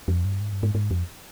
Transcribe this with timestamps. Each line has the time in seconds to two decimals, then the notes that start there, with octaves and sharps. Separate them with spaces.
0.08 F2
0.25 G2
0.41 G#2
0.53 G2
0.63 G#2
0.75 G#2
0.91 F2